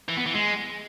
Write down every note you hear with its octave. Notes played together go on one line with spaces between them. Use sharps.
E3
B3
E3
G#3